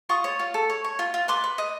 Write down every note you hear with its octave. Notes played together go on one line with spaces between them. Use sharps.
F4 C#6 D#6
C#5
F4
A4
C#5
C#5
F4
F4
B4 C6 D6
B4
D#5